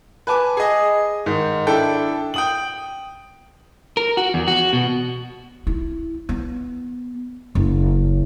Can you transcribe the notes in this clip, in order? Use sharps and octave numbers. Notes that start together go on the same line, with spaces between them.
B4 G#5 A5 D6
G#4 D#5
G#2 D#3
D4 E4 A4 G5
G5 D#6 F#7
A#4
F#4
E2
F#4
B2
E4
B3
F#1